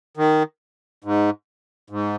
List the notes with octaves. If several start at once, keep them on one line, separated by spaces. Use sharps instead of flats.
D#3
G#2
G#2